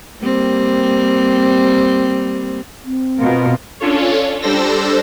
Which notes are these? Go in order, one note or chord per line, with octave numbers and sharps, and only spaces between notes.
G3 A#3 C4
C4
B2 F4 A#4
C#4 D4 F4 A4 C#5
G3 D4 A4 C5 E6 A#6